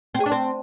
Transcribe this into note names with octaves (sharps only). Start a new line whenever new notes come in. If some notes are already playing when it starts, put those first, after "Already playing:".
C4
G#4
D4
C4